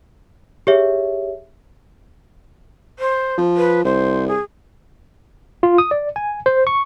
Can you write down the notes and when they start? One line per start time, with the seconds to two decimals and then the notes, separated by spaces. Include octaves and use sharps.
0.67 G4 G#4 C#5 E5
2.99 C5
3.38 F3
3.57 B4
3.85 C2 C5
4.28 G#4
5.63 F4
5.78 D#6
5.91 D5
6.16 G#5
6.46 C5
6.67 C#6